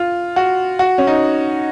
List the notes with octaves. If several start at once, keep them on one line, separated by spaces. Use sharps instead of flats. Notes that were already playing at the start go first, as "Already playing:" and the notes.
Already playing: F4
F#4
F#4
C#4
D#4